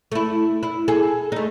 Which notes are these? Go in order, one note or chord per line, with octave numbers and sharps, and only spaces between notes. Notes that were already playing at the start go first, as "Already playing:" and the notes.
A3 E4
E4
G#4 A4
A3 D#4